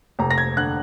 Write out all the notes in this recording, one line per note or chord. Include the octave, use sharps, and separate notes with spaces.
F1 A#5
A#6
G#6
D3 F#6